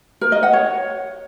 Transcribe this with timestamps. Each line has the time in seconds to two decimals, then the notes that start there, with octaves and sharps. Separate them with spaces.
0.21 A#4
0.32 D#5
0.43 F#5
0.53 C#5